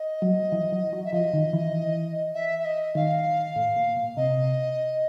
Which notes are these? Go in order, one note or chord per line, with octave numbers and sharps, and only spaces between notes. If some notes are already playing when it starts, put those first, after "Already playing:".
Already playing: D#5
F#3
E3
F#3
F#3
E5
F3 D#5
D#3
E3
E5
E5
D#5
D#3 F5
A2
A#2
A#2
C3 D#5